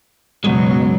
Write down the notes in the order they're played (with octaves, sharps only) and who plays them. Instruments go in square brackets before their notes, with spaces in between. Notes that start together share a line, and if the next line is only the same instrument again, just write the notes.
[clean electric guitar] C#2 F#2 G#3 [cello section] B2 F#3